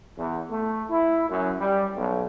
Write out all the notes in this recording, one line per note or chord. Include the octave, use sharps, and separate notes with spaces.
E2
A3
E4
F#2
G3
B1